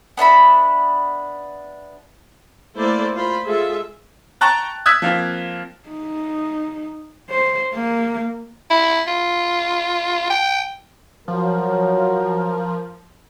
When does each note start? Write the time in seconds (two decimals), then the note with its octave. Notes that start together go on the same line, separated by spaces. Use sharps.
0.17 B3 D4 E5 B5
2.76 A3 A#3 E4 C5 D5
3.13 F4 C5 B5
3.45 G#3 F4 G#4 A4 E5
4.41 G5 A5 A#5 C#6 F#6 A6
4.86 D#6 E6 F#6 G#6 B6
5.02 F3 A#3 C4
5.89 D#4
7.30 C5
7.74 A#3
8.71 E4
9.07 F4
10.30 G5
11.28 F3 F#3 A#4